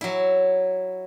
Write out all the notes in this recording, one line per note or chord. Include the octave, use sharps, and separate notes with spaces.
F#3 E4